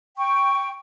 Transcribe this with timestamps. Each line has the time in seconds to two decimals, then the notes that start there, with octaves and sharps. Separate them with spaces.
0.17 G5 C#6